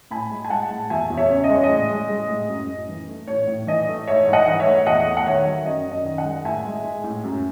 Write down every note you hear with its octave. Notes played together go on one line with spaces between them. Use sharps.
A2 G#5 B5
G#3
G#5
G#3 F#5 A5
A2
E2 E5 G#5
E2
C#5 E5
C#3
D#5
G#3 C#5
D#5
A2
G#3
G#3
A2
F#2
F#2
E3
A3
A2 C#5
A2
E3 D#5
A3
G#2 C#5 E5
G#2
D#5 F#5
E3
C#5 E5
A3
E2 D#5 F#5
A3
F#5
D#3 C#5 E5
F#3
F#2 D#5
F#2
D#5
D#3
D#5 F#5
G#3
A2 E5 G#5
G#3
G#3
A2
F#2